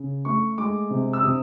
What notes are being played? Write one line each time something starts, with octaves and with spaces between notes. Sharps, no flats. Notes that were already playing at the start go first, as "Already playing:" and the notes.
Already playing: C#3
A3 C#6
G#3 D6
C3
E6
C3 D#6